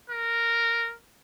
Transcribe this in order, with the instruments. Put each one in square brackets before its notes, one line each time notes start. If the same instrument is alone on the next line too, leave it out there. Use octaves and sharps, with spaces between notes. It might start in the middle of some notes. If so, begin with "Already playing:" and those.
[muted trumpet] A#4